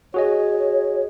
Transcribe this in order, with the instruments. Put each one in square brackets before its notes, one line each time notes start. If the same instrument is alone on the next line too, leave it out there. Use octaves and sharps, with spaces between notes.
[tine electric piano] F#4 G#4 D#5 [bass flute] C#5